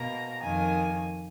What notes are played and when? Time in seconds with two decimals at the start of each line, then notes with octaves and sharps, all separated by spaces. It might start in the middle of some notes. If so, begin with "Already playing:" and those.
Already playing: B2 A#3 A#5
0.42 F2 D#3 A#3 G#5